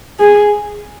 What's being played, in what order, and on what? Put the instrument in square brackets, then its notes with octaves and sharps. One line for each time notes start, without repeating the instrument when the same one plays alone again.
[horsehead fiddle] G#4